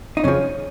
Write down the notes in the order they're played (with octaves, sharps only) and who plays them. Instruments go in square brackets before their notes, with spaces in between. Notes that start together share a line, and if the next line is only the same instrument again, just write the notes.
[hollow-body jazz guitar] D#4
F2 C#3 F3 C#4